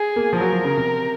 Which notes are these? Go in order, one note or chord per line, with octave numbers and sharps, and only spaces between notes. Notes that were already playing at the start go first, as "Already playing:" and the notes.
Already playing: G#4
A#3
F3
F#3 A#4
F3
C#3
C3